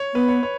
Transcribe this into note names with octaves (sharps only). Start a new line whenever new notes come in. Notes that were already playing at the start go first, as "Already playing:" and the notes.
Already playing: C#5
B3 B4
C#5
C#5